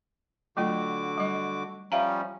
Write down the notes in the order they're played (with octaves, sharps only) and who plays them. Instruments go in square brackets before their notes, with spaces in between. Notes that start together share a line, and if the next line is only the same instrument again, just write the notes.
[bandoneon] D3 F#4 D6 [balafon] F#3 A3 F4
[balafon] G3 D#5
[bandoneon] F3 G3 C#4 [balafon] E5 F5 A#5